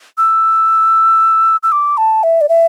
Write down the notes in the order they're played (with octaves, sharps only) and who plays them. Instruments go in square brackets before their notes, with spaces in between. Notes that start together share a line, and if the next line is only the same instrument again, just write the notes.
[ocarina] E6
E6
D6
A5
E5
D5
E5